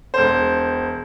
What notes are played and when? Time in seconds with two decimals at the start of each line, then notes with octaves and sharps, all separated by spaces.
0.14 E1 C5